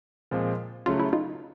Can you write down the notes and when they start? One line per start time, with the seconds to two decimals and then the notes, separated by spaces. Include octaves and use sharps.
0.31 A#2 F3 G#3 C4 F4
0.86 C#3 F#3 A3 F4
1.00 E4
1.13 D#4 F4